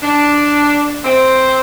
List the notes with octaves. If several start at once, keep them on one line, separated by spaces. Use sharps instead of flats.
D4
C4